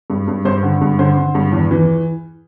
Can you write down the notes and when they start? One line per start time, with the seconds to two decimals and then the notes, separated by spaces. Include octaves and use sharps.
0.10 G2
0.28 G2
0.45 G2 C5
0.63 D3
0.81 G2
0.99 D3 C5
1.17 D3
1.35 G2
1.52 E2
1.71 E3